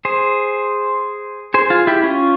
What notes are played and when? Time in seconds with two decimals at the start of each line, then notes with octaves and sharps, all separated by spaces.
0.05 G#4 C5
1.54 G#4 C5
1.70 F4 G#4
1.87 E4 G4
2.04 C#4 F4